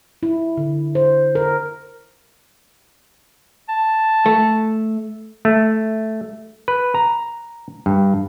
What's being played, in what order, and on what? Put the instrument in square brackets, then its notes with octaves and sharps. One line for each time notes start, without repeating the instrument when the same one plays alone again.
[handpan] E4
D3
C5
A#4
[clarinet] A5
[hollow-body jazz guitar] A3
[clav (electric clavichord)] A3
B4
A#5
G2